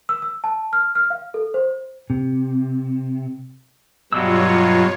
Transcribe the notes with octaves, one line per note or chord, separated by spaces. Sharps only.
E6
E6
A5
F6
F6
F5
A4
C5
C3
G2 B2 F#3 G3 F4 C#5 E6